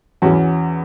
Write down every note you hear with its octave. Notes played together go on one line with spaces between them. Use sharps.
E2 E3 C#4 F#4